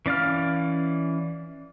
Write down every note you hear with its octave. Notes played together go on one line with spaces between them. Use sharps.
E3 C#4 D5 F5 F6